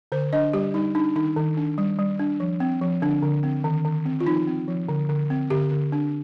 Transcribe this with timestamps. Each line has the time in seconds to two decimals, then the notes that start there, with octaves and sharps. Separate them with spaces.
0.12 D3 C5
0.33 D4 D#5
0.53 G3 G4
0.74 G3 D#4
0.95 D4 D#4
1.16 D#3 D#4
1.37 D#3
1.57 D4
1.78 G3
1.99 G3
2.19 D4
2.40 F3
2.60 C4
2.81 F3
3.02 D3 D4
3.23 D3
3.43 C4
3.64 D#3
3.85 D#3
4.06 C4
4.20 F4
4.26 F3 D#4
4.47 C4
4.68 F3
4.89 D3
5.09 D3
5.30 C4
5.50 D3 G4
5.71 D3
5.92 D4